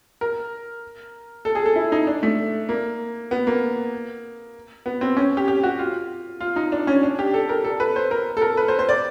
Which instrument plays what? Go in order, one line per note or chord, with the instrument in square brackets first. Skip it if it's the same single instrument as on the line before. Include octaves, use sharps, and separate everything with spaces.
[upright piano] A#4
A4
G#4
A4
E4
D#4
D4
A3
A#3
B3
A#3
B3
C4
C#4
G4
G4
F#4
F4
F4
D#4
D4
C#4
D4
G4
A4
A#4
A4
B4
C5
A#4
A4
A#4
B4
C5
C5
D5